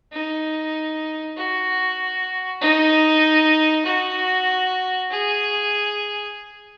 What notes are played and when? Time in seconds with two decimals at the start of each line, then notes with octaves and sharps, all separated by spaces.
0.12 D#4
1.37 F#4
2.61 D#4
3.85 F#4
5.10 G#4